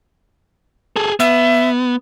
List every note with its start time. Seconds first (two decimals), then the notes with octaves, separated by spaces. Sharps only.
0.96 G#4 A4
1.20 B3 E5